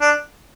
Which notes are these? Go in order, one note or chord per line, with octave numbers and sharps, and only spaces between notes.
D4